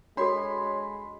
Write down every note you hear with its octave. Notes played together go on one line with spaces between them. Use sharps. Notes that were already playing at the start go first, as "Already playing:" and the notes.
G#3 D4 F#4 A4 C#5 B5 C6